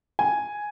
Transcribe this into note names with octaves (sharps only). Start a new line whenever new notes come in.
G#5